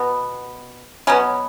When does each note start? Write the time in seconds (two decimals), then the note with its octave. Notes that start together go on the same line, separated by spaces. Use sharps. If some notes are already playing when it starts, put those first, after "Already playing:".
Already playing: B2 B3
1.07 B2 F#3 B3 C#4